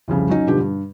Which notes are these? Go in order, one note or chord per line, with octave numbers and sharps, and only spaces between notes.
C2 F2 C#3 G3
F#3 C#4 D#4
G2 B2 D3 F3 G4
G2